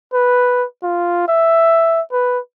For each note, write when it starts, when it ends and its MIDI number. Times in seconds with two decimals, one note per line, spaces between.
0.13 0.65 71
0.83 1.23 65
1.28 2.01 76
2.12 2.39 71